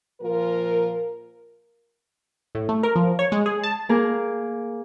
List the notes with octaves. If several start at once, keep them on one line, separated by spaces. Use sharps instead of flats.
A#2 F3 F4 A#4
A2
A3
A#4
F3
C#5
G#3
G#4
A5
A#3 G#4 A#4